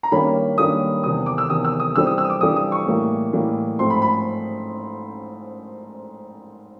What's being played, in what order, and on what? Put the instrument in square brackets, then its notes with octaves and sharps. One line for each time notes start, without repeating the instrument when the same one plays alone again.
[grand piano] A#5
G2 D#3 G3 A#3 C#4 B5
G2 D#3 G3 A#3 C#4 D#6
E2 C3 D#3 D#6
D6
E6
E2 C3 D#3 D#6
E6
D#6
G2 E3 G3 C4 E6
D#6
E6
D#6
D6
G2 E3 G3 C4 D#6
D#6
C#6
A2 E3 G3 A#3
A2 E3 G3 A#3
G#2 F3 A3 C4 C6
B5
B5